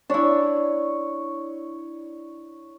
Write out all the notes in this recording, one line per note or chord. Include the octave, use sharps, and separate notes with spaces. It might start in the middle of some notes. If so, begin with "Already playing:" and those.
D4 E4 C#5